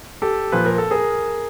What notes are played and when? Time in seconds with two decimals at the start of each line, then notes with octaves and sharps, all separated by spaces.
0.22 G4 A4
0.52 A#2 F3 B4
0.66 A#4
0.78 A4
0.91 G#4 A#4